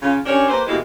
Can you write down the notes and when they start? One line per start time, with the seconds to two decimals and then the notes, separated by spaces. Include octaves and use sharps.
0.02 C#3 F4
0.26 C#4 D4 G4 A#4 C#5
0.49 A#3 G4 B4 C5
0.67 B2 E3 G#3 A#3 E4 G4